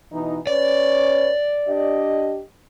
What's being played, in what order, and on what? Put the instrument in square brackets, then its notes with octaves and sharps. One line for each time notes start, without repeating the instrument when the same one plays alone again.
[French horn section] B2 E3 D#4
[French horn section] C#4 B4 C#5 [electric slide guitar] D5
[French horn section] D4 G4 D#5